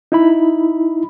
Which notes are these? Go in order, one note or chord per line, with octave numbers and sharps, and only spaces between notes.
D#4 E4 B5